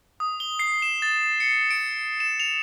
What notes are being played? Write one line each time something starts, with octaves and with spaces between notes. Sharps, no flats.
D#6
G7
C7
E7
A6
C#7
D7
E7
F7